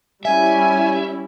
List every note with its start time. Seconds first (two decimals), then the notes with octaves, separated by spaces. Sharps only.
0.25 G3 C#4 E4 E5 G#5